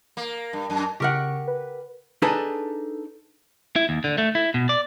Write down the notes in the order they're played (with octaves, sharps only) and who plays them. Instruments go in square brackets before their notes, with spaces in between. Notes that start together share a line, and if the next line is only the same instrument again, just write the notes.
[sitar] A#3
G2
F#2
[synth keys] C#3 C#6 [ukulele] G4 A#4 F#5
[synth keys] B4
[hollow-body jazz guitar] D4 D#4 G#4 A4 B4 A5
[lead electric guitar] E4
D#2
D3
A3
E4
B2
D5